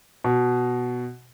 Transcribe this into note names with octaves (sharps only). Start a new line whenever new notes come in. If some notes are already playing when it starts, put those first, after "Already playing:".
B2